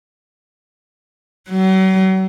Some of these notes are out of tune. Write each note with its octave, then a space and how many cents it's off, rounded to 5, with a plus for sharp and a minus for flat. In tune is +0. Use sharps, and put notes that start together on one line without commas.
F#3 +40